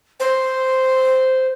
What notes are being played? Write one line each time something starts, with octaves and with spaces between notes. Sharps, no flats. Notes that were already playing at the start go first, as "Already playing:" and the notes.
C5